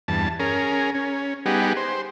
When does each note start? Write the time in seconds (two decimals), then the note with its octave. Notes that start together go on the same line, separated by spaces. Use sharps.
0.08 E2 G2 A5
0.40 C#4 G#4 A#4
0.94 C#4
1.46 G3 B3 D#4 G4 G#4 F#5
1.77 C5